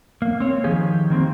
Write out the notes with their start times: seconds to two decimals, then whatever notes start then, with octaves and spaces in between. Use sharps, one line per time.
0.22 A#3
0.40 C4 C#5
0.64 D#3 F3 G4 G#4
1.10 D#3 A#3 C4